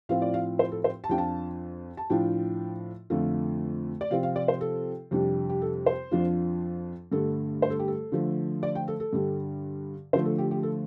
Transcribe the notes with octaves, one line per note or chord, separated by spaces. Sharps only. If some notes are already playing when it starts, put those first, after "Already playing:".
A2 F3 C4 F4 F5
D5
F5
C5
A4
C5
A5
F2 F3 D4 F4 G5
A5
A5
A2 F3 D4 F4 G5
F2 D3 A3 F4
D5
C3 F3 C4 F4 F5
F5
D5
C5
A4
F2 C3 G3 D4
G4
A4
C5
F2 F3 D4 F4
G2 D3 A3 A4
C5
A4
G4
A4
D3 F3 A3
D5
G5
A4
A4
G2 D3 G3
D3 F3 A3 C5
A4
G4
G4
A4